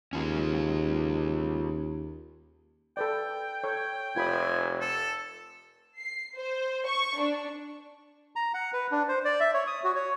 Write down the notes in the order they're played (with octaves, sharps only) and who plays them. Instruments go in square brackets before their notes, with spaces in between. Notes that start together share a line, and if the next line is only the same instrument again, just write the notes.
[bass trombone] D#2 [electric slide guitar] C#4 F4 G#4
[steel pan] A4 B4 D5 [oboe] G5
[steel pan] A4 C#5
[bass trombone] F1 [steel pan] F4 B5 D#6 [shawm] G#5
[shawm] A4
[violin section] C7
C5
C#6
D4
[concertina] A#5
F#5
B4
D4
C5
D5
E5
C#5
D#6
F#4
C#5